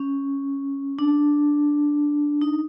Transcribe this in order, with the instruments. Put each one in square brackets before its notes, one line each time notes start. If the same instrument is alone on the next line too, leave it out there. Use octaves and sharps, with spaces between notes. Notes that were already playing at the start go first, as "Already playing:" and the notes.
Already playing: [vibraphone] C#4
D4
D#4